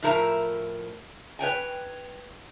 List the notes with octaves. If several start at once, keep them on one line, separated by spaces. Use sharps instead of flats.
A2 F3 E4 A#4 A#5
B4 C#5 G5 G#5